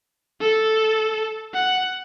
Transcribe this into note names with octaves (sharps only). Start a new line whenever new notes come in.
A4
F#5